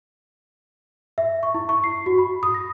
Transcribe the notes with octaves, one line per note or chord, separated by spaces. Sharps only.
E5
C#6
E4
C#6
C7
F#4
B5
D#6
A#6